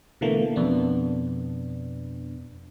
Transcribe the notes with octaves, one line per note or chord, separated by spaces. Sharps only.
B2 D3 E3 A3 A#3
F2 B2 B3 D4